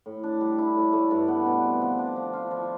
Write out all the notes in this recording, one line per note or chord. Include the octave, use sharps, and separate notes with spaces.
A2
D4
G3
E4
A2
A3
G2
B3
B2
C4
F3
D4
F3
F4
F3